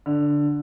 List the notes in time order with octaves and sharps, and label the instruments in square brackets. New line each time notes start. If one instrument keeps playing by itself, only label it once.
[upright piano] D3